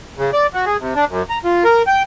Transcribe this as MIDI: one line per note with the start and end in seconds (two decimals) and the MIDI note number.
0.17 0.31 49
0.33 0.47 74
0.54 0.65 66
0.66 0.77 68
0.80 0.94 48
0.95 1.05 62
1.09 1.23 42
1.30 1.39 82
1.44 1.64 65
1.64 1.82 70
1.87 2.03 79